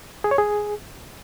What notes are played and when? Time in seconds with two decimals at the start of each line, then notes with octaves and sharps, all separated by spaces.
0.24 G#4
0.31 C#5
0.38 G#4